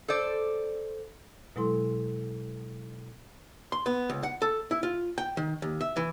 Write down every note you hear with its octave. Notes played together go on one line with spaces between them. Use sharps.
A4 C5 D5
B2 F#3 G#3 E4 A4 C6
C6
B3
C#2
F#5
A4
E4
F4
G5
D#3
D#2
E5
E3